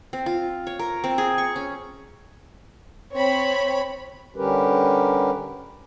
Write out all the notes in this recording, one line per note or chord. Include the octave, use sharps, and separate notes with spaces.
C4
F4
C#5
A#4
C4
G#4
C#6
C#4
C4 C#5 B5
D3 G3 C#4 G4 A#4 B4